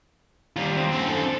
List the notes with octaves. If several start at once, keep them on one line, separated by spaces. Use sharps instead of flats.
D#2 G3 F4
C4
F#2 D3
A4